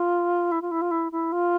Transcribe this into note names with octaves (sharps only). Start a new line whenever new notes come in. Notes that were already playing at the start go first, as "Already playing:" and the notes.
Already playing: F4
E4
F4
E4
F4
E4
E4
F4